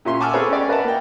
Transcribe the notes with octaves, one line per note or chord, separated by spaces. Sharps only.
A#2 C#4 E5 C6
F#5 G#5 A5 D6 E6 F6
B3 C4 G#4 A4 B4 C#5
C#4 G4 D5
A#4 B4 D5 E5 F#5 A5
A#3 G5